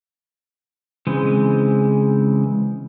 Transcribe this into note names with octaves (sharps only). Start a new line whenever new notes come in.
C#3 E3 G#3 C4